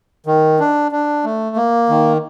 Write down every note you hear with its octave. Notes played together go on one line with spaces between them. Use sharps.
D#3
D4
D4
A3
A#3
D#3